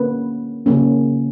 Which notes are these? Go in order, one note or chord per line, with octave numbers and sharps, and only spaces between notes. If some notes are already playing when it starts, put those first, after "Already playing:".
Already playing: D3 A#3 C#4 B4
C#3 F#3 A#3 C#4